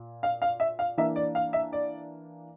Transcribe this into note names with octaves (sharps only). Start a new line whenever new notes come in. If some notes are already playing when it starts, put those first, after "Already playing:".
Already playing: A#2
F5
F5
E5
F5
E3 A#3 D4 E5
D5
F5
E5
D5